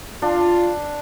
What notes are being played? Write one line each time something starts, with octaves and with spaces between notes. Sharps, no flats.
D4 F4